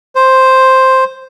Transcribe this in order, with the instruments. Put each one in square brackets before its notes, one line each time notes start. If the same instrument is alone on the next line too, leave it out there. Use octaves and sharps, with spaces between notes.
[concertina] C5